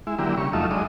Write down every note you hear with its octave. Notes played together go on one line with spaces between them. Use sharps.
G#3 E4
D3 F#3 A#3 E4 G4
C#3 G3 C#6
F2 F#3 A3 D#4 F4 E5
F#3 G#3 D4 D#5